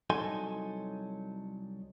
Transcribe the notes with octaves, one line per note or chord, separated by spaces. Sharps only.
C2 F#3 D#4 A4 G#5 C6